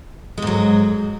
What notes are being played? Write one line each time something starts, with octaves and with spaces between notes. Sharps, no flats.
G#2 F#3 G#3